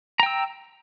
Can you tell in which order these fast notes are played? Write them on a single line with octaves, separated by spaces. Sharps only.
A#5 G5 E6